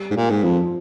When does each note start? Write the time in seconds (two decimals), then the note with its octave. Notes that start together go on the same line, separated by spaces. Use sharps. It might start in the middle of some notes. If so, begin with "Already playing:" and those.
Already playing: G3
0.11 G#2
0.16 A#2
0.30 G#2
0.43 F2 F3